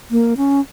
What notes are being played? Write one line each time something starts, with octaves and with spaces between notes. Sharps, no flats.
A#3
C#4